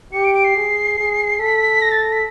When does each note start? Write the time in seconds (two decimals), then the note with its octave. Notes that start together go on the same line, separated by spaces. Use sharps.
0.13 G4 C#7
0.25 D7
0.35 D7
0.44 C7
0.56 G#4
0.98 G#4
1.39 A4 B6
1.82 A#6
1.92 A6
2.02 A#6
2.13 B6